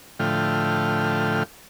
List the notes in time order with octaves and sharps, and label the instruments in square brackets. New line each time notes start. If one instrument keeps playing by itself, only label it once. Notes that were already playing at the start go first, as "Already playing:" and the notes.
[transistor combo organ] A2 D3 F3 A3 G5 F6